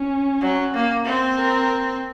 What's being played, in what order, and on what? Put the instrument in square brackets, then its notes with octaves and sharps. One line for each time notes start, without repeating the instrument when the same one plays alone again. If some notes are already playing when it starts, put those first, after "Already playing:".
Already playing: [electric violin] C#4
[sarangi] F#3
A#3
C4
[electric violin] A#4